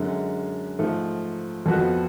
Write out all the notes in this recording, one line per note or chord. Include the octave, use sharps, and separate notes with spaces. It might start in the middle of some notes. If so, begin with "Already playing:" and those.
Already playing: F#2 D3 G#3
G#2 F3 A3
F2 F3 B3 F#4